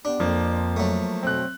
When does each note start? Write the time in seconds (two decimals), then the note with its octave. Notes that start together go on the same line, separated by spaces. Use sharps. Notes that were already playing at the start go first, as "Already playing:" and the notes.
0.05 B3 D4 G4
0.20 F2 F3 A#3
0.76 F#3 A3
1.23 F2 B2 C4 F#6